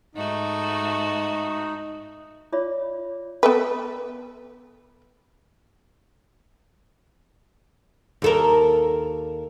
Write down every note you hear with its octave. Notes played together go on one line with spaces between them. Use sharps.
G#2 A3 D#4 F#4
F4 C#5 D5 E5 B5 D6
B3 A4 B4
D#2 A4 A#4